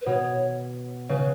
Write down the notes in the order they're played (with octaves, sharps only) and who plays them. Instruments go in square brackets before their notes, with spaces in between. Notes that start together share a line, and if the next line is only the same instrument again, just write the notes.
[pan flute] B4
[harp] B2 [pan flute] C#5
[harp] C#3 [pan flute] B4